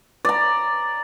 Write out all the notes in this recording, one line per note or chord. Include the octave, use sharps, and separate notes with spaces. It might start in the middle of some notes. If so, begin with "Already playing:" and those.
D5 A#5